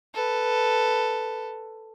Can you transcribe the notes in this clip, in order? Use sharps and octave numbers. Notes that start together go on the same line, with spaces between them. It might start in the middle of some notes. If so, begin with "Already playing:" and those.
A4 B4